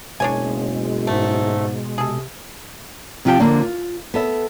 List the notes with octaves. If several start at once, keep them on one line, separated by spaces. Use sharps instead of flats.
F#1 B2 G#3 D4 C#5 G#5
G#2 A3
C3 G#4 A4
C3 F3 F4 G4 G5 A5
D3 F3 A#3 D4
F4
B3 A4 E5